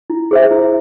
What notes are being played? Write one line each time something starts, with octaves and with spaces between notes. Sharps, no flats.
E4
G#4 C5 E5
E4